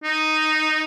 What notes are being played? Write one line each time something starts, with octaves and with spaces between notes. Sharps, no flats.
D#4